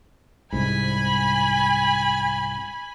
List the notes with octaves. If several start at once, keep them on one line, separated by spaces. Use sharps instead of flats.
C2 G#2 G#5 B5